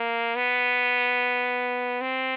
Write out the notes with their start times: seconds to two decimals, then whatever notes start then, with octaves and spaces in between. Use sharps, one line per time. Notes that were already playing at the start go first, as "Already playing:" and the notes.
Already playing: A#3
0.36 B3
2.01 C4